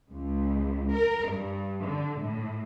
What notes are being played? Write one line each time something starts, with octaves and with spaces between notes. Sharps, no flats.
C#2
A#4
G2
D3
A2